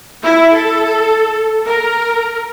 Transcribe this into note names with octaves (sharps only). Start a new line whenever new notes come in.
E4
A4
A#4